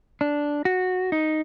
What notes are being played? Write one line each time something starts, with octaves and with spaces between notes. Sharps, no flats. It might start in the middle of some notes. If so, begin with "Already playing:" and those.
D4
F#4
D#4